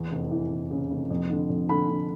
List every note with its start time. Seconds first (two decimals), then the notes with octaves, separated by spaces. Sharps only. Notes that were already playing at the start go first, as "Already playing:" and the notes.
Already playing: E2
0.12 F1
0.31 E3
0.51 F1
0.71 C#3
0.90 F1
1.11 F2
1.30 D3
1.49 F2
1.69 D3 B5
1.88 D3